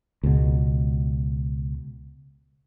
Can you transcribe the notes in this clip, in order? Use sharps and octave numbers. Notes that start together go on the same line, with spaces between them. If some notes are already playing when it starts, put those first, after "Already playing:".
C#2 B2